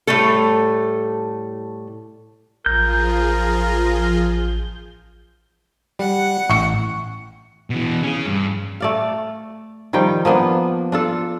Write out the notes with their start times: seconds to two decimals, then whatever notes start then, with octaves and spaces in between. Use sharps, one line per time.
0.07 A2 G3 A3 A4
2.66 A1 F3 F4 G#4 A#4 G6
5.99 G3 F#5
6.50 A1 C#6 C#7
7.70 B2 E3
8.03 C#4 G#4
8.26 G2
8.80 A3 D5 F5
9.93 D#3 F3 G3 G5
10.25 F3 A#3 B3 D4
10.92 D4 F4 A4